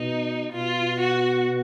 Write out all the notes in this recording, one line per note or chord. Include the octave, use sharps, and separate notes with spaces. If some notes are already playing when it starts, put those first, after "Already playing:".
Already playing: B2 D#4
B2 F4
F#4